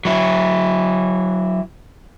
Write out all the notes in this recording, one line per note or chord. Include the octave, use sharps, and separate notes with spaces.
F#3 E4